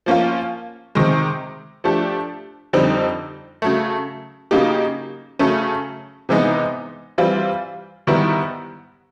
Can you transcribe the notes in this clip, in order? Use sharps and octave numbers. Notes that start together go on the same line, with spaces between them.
F3 A#3 C#4 F4
C3 D#3 G#3
F3 A3 D4 G4
F2 D3 G3 C4 D#4
C#3 F#3 A3
C#3 F#3 A#3 D#4 G4
C#3 F#3 A3 C#4
C3 E3 G#3 B3 D#4
E3 G3 C4 F4
G#2 D#3 G3 B3 E4